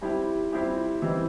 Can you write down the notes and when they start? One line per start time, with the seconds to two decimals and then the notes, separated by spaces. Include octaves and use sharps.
0.01 G3 C4 E4 G4
0.52 G3 C4 E4 G4
1.02 E3 G3 C4 D#4